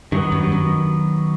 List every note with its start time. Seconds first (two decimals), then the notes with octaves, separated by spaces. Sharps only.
0.12 G2 D#3 F#3 B3
0.32 F#2
0.43 G2
0.52 F#2